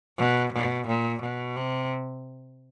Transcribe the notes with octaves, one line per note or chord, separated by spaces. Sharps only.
B2
B2
A#2
B2
C3